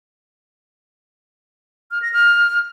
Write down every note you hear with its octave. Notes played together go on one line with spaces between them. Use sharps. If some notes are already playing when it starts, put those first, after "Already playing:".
F6
A#6
F6